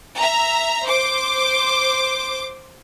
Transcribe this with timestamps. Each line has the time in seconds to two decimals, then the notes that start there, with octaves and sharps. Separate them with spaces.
0.18 E5 A#5
0.85 C5 D6